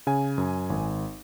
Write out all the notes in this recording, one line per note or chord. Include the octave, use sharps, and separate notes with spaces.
C#3 G#5
F#2
G#1